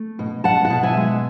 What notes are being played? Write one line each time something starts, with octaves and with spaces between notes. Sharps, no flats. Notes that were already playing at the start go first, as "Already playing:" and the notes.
Already playing: A3
B2
B2 F#5 A5
F#5 A5
B2
E5 G#5
G#3